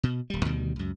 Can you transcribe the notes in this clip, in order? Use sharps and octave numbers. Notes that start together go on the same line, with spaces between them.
B2
D#1 G3
D2 B2 D#3 G3
C#2 F#2